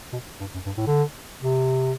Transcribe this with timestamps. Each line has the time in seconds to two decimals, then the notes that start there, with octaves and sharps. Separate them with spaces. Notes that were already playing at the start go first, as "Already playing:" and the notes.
0.13 B2
0.41 G2
0.55 F#2
0.66 G2
0.77 A2
0.87 D3
1.42 C3